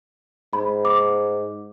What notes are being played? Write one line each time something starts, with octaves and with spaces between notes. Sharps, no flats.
G#2 B5
D6